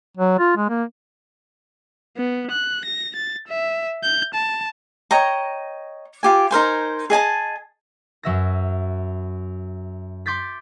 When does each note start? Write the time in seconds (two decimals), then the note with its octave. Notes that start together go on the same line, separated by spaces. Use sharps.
0.17 F#3
0.39 F4
0.57 G#3
0.69 A#3
2.17 B3
2.51 F#6
2.85 A#6
3.16 A6
3.48 E5
4.03 G6
4.34 A5
5.11 C#5 D#5 G5 A#5
6.23 F4 G4 G#5
6.51 D#4 A#4 C5 G#5
7.10 G#4 D#5 G#5 A5
8.23 F#2 F#3 E5 A#6
10.26 C6 D6 G6 A6 B6